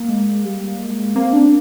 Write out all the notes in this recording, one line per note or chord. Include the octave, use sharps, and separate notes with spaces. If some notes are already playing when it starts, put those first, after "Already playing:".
Already playing: A#3
G#3
G3
G#3
A#3 C4
D4